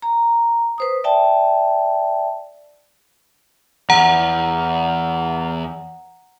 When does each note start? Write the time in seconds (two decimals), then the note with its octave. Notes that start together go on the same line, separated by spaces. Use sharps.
0.02 A#5
0.78 B4 C5 D#6
1.04 D5 E5 G5 A5
3.90 E2 F#5 A#5